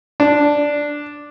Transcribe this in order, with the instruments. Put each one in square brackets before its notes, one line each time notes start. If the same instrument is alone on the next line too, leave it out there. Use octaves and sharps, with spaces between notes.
[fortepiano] D4